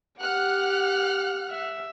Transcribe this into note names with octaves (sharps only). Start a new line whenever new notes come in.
G4 F#5 F6 F#6
E5